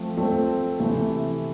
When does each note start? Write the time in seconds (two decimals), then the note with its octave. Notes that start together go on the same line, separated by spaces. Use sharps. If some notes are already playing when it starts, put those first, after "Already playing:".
Already playing: F3 A3 C4
0.18 F3 A3 C4
0.80 C3 E3 A3